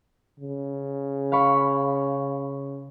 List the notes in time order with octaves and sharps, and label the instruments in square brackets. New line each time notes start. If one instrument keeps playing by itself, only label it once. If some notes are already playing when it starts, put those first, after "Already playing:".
[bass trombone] C#3
[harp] F5 B5 C#6